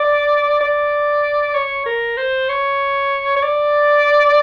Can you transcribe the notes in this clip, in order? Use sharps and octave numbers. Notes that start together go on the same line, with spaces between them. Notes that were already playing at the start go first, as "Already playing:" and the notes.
Already playing: D5
D5
C#5
A#4
C5
C#5
C#5
D5